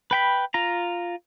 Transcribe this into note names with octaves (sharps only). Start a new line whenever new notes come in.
B4 G5 B5
F4 A#5